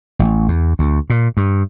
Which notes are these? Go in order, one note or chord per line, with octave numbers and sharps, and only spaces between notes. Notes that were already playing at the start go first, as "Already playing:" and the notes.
A1
E2
D2
A#2
G2